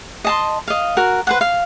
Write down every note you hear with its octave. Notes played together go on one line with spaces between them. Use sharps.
D#5 A5 C6
D#5 F5
F#4 A#4
B4 C5 F#5
F5